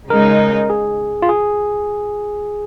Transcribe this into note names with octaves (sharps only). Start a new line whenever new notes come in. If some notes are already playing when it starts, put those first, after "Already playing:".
C#3 G#3 D#4 A#4
G#4
F4
G#4